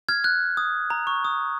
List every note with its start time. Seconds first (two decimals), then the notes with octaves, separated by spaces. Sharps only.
0.09 F6 G#6
0.24 F#6
0.57 D#6
0.90 A#5
1.07 C#6
1.25 D#6